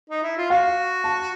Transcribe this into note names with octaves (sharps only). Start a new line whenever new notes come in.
D#4
E4
F4
F#4 F5
A5